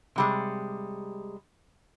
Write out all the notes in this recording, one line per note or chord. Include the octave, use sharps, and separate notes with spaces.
C3 G3 G#3